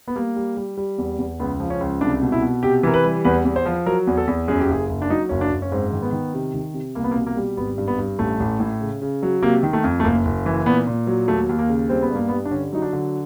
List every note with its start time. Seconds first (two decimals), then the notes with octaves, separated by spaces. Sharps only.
0.08 B3
0.16 G3 A#3
0.36 G3
0.57 G3
0.77 G3
0.98 E2
1.19 E2
1.40 C#2 B3
1.60 F3
1.70 C#4
1.80 C#2
2.01 C2 D4
2.22 B2
2.32 E4
2.42 B2
2.63 C3 G4
2.83 E3 A#4
2.94 B4
3.04 G3
3.25 E2 B4
3.45 E2
3.56 C5
3.66 F3
3.86 F#3 A#4
4.07 E2
4.17 A4
4.27 E2
4.48 F#2 G#4
4.60 G4
4.68 F#1 G#4
4.89 F#1
5.02 D4
5.10 F#3 D#4
5.29 F#1 C#4
5.41 D4
5.51 F#1
5.62 C#4
5.72 G#2 C4
5.92 D#3
6.02 B3
6.12 D#3
6.34 C3
6.54 D#3
6.74 C3
6.95 C2 A#3
7.04 B3
7.11 A#3
7.16 B2
7.27 A#3
7.37 G3
7.57 G#1 B3
7.78 G2
7.88 B3
7.99 G2
8.19 A1 A3
8.40 A1
8.60 A2
8.81 C#3
9.02 C#3
9.23 F#3
9.43 C3 A#3
9.63 D#3
9.73 A3
9.84 F2
10.00 A3
10.04 F#1 A#3
10.25 F#1
10.46 E3
10.66 A#2 B3
10.87 A#2
11.07 F#3
11.28 D#2 A3
11.49 D#2
11.59 A#3
11.69 C#3
11.89 G3 C4
12.02 B3
12.11 G2 A#3
12.28 B3
12.31 G3
12.45 D4
12.51 D3 C#4
12.72 F#3 D#4
12.82 D4
12.93 D3